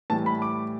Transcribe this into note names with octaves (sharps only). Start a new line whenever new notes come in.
A2 E3 G3 A5
B5
D6